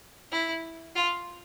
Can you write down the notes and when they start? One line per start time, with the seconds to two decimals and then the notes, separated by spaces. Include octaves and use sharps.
0.32 E4
0.95 F4